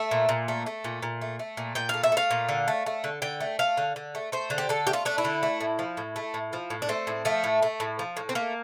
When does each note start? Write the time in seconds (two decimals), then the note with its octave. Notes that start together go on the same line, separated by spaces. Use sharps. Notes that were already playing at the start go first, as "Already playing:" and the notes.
Already playing: A3 E5
0.11 A#2
0.29 A#2
0.48 A3
0.66 A3
0.84 A#2
1.03 A#2
1.22 A3
1.39 A3
1.57 A#2
1.75 A#2 G5
1.89 A3 F5
2.03 E5
2.12 A3 F5
2.30 A#2
2.49 D3
2.68 A3
2.86 A3
3.04 D3
3.22 D3 G5
3.40 A3
3.59 A3 F5
3.77 D3
3.96 D3
4.15 A3
4.32 A3 C5
4.50 D3
4.58 G4
4.69 D3 A4
4.87 A3 G4
4.93 F4
5.05 A3 D4
5.18 E4
5.25 D3
5.43 A3
5.61 A2
5.79 F3
5.97 A2
6.16 A3
6.34 A2
6.53 F3
6.70 A2
6.82 D4
6.89 A3 C4
7.07 A2
7.25 F3 A3
7.44 A2
7.63 A3
7.80 A2
7.99 F3
8.17 A2
8.29 C4
8.35 A3 A#3